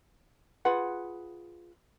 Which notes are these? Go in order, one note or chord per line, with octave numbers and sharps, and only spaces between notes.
F4 G#4 B4 F#5